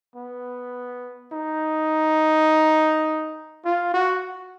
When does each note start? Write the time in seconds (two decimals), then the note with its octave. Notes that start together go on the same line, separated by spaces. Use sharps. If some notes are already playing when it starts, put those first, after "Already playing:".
0.16 B3
1.32 D#4
3.65 F4
3.94 F#4